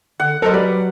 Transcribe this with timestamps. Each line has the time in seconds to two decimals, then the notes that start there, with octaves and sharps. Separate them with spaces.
0.20 D3 F#5
0.42 F#3 A4 A#4 C5 D#5
0.54 G3 B4 D5